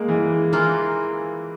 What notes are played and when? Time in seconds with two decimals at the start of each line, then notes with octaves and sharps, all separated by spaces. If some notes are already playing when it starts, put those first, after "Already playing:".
Already playing: G#3 A#3
0.08 E3
0.52 E3 A#3 F4